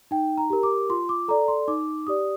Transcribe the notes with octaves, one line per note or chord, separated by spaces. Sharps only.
D#4 G5
A#5
G4 A#4
D6
F4 C6
D6
A4 D5 A#5
C6
D#4 D6
G4 D5 D#6